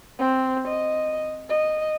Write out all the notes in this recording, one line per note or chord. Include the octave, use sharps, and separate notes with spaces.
C4
D#5
D#5